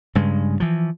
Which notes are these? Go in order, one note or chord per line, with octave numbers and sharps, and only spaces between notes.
G2 C#3 G#3
E3 F3